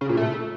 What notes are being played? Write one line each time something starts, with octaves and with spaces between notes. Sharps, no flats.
C#3
A#2
A3